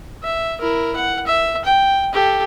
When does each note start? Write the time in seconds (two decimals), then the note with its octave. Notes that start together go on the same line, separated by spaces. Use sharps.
0.23 E5
0.60 E4 A#4
0.96 F#5
1.27 E5
1.65 G5
2.13 G4 A4